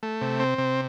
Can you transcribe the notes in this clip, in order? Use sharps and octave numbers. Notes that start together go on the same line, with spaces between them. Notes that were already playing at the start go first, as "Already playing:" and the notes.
A3
C3
C4
C3